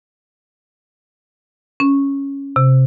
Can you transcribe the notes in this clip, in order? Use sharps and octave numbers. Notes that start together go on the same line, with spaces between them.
C#4
C3